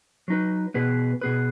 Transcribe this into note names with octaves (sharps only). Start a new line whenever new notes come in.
F#3 D#4 B4
B2 B3 G#4 B4
B2 B3 G#4 B4